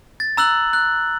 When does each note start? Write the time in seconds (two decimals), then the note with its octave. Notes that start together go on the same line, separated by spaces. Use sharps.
0.20 A6
0.37 A#5 E6 F#6 F#7
0.73 F#6